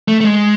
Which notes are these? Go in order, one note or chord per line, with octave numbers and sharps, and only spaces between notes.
A3
A3
G#3